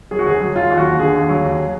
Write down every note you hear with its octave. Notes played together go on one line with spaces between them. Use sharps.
F#3 G#4
F#4
D2 G#4
F#3
F#3 F4
D#2
F#4
D#2
D3 G#4
D#2
F#3
D#2